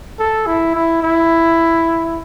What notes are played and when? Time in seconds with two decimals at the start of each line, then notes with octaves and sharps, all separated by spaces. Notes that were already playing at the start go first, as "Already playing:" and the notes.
0.19 A4
0.47 E4
0.75 E4
1.03 E4